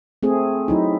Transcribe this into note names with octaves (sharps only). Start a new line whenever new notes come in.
A3 C4 G#4
F#3 D#4 E4